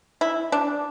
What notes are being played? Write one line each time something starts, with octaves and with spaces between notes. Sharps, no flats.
E4
D4